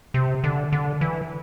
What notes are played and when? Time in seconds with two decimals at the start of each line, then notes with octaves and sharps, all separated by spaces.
0.14 C3
0.44 D3
0.72 D3
1.01 E3